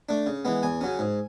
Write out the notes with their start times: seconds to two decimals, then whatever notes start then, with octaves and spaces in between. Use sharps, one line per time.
0.09 A3 D4
0.26 C#3
0.45 E3 G#3 B3
0.63 E2 G#5
0.81 C#3 F#3 C#4
0.99 G#2